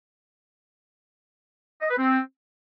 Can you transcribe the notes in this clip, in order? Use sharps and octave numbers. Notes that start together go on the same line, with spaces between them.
D#5
B4
C4